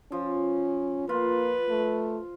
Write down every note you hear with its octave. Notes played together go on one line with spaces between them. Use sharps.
F3 C#4
A#3 F4 B4
A3